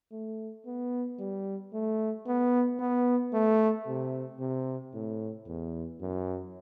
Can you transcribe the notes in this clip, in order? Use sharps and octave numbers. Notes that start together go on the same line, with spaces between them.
A3
B3
G3
A3
B3
B3
A3
C3
C3
A2
E2
F#2